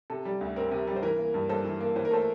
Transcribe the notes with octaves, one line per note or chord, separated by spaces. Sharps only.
C3 A4
G3
D2
C4 A#4
C3
G3
C5
E3 A#4
A#3
G2
G2 A4 C5
E3
A#3
E3 C5
A#4
A3 A4 C5